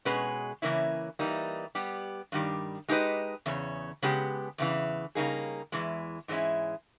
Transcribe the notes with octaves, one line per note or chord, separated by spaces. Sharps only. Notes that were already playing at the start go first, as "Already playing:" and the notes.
B2 G#3 C#4 G#4 B4
C#3 E3 A#3 C#4 E4
E3 G3 A#3 D#4
G3 B3 G4
G2 D#3 G3
G#3 D#4 G4 B4 D#5
E2 C#3 C#4
C#3 G#3 B3 G4
E2 C#3 E3
C#3 G3 A#3 D#4 G#4
E2 C#3 E3 G#3
G#2 E3 G#3 C#4 E4